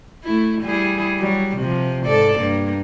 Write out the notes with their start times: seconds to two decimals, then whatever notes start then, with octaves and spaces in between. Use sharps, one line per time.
0.24 A3 E4
0.61 G3 E4 G#4
1.19 F#3 G3
1.57 C3 F3
2.05 G#2 A4 D5
2.39 G2 A#3